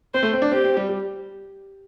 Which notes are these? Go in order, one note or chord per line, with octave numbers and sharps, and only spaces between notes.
C4 C5
A3
C4
D4
C4 G4
C4
G3
G3